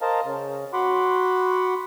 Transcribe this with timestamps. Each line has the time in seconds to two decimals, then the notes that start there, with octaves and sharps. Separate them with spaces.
0.02 A#4 C5 D#5 F5 A5 A#5
0.24 C#3
0.73 F#4 F#5 B5 C6 D6